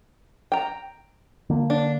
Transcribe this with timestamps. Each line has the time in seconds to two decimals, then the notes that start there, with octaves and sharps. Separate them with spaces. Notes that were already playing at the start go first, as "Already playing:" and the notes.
0.52 G5 A#5
1.50 D3 A#3
1.70 D4